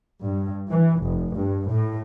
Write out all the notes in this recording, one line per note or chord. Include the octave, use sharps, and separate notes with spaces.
G2
E3
F1
G2
A2